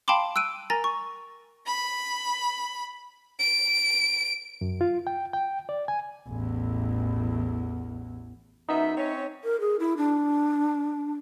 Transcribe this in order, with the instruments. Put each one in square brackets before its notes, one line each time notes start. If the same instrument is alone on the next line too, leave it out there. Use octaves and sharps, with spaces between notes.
[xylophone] F5 G5 A5 B5 C6 D6
E6 F#6 D7 D#7
A#4 G#5 A#5 A6 A#6
C#6
[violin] B5
D7
[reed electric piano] F#2
F4
G5
G5
D5
G#5
[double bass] A1 E2
[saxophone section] F#2 B3 E5 [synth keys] D#4
[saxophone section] C4 C#4 C#5
[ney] A#4
G#4
E4
D4